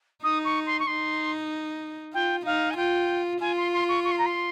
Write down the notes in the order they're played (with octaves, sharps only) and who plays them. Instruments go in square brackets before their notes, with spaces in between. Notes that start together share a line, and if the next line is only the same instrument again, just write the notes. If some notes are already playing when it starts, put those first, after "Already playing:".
[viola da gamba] D#4 [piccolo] D#6
[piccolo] C#6
C6
C#6
[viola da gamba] D#4 [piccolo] C6
[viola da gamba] F4 [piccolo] G5
[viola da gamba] D#4 [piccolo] F5
[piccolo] G#5
[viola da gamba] F4 [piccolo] G5
[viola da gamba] F4 [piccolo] G#5
[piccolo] C6
C6
C#6
C#6
C6
A#5
C6